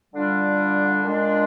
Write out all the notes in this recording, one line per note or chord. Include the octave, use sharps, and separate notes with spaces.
D3 G3 D4 F4
A#2 G#3 D4